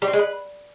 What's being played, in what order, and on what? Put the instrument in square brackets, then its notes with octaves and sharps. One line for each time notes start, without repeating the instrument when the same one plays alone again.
[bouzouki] G3
C4
G#3
B4